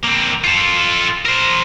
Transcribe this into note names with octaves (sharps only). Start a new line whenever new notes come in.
A#3 C4
F4 A4
A#4 C5